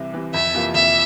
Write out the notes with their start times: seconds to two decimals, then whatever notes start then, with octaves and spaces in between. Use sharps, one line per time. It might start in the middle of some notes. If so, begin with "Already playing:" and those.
Already playing: C2 C3 E3
0.14 C3 E3
0.34 F2 E5
0.54 C3 E3 A#3 F4
0.74 F2 E5